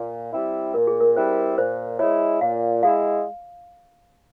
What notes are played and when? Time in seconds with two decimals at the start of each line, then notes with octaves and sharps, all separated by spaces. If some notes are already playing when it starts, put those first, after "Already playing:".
Already playing: A#2
0.33 G3 C4 E4
0.74 A#2 A#4
0.87 G#4
1.00 A#4
1.16 G3 C4 E4 C5
1.58 A#2 C5
1.99 G#3 E4 C#5
2.41 A#2 F5
2.82 G#3 E4 F5